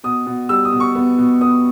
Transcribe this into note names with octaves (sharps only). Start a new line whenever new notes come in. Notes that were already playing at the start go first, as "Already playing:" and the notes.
B2 D#6
B2
G3 E6
D#6
B2
C#6
B3
B2
B3 D#6